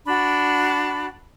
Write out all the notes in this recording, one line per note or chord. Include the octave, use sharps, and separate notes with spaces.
D4 F#4 B5